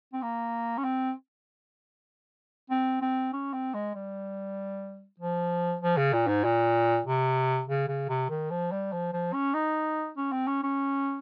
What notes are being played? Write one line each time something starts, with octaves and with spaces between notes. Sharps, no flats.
C4
A#3
C#4
C4
C4
C4
C#4
C4
G#3
G3
F3
F3
C#3
A#2
G#2
A#2
C3
C#3
C#3
C3
D#3
F3
G3
F3
F3
C#4
D#4
C#4
C4
C#4
C#4